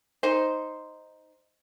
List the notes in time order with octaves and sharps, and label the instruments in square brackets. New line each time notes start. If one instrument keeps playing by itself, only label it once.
[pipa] D#4 C5